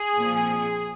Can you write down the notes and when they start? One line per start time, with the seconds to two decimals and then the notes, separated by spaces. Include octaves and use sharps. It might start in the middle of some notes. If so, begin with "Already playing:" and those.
Already playing: G#4
0.16 A#2 F3 C4